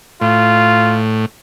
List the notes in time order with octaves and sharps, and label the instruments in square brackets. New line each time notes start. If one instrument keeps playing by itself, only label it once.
[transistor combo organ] A2 [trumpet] F4